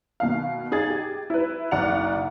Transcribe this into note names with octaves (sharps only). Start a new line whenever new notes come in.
B2 D#3 F5
D#4 G#4 G#6 A6
G4
E4 B4
F#1 B1 D5 F#5 C#7 F7